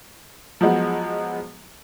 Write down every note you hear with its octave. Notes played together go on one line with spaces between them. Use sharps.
F3 F#3 G#3 B3